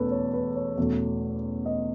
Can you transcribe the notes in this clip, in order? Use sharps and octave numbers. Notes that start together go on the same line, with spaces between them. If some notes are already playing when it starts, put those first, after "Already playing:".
Already playing: E2 B2 A3 C#4 A4 B4
C#5
B4
C#5
E2 B2 A3 C#4
D#5